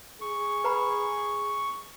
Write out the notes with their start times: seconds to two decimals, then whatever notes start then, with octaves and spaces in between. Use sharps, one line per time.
0.21 G#4 C#6
0.64 B4 A#5 B5